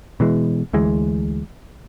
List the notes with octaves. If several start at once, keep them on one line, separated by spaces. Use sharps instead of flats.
B2 E3 G#3
D2 E3 G#3